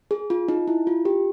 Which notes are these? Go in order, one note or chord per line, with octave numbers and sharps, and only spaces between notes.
G#4
F4
D#4
E4
F4
G4